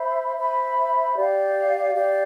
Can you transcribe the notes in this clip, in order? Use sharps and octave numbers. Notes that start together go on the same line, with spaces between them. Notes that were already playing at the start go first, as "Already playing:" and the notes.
Already playing: C5 E5 B5
C5 E5 B5
G4 D5 F5
G4 D5 F5